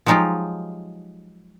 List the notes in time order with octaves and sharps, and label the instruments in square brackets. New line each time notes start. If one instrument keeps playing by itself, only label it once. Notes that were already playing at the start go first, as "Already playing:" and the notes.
[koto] F3 F#3 G#3 D#4 F4 G4